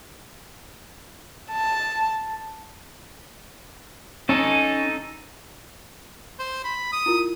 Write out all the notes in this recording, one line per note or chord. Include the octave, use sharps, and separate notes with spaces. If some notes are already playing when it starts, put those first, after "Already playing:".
A5
C#4 D#4 A4 G#5 A5
C5
B5
D#6
E4 F4 A#4